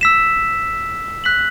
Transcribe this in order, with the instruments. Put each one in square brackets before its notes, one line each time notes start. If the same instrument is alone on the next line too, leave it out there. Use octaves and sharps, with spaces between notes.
[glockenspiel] E6 B6 E7
F#6 B6 F#7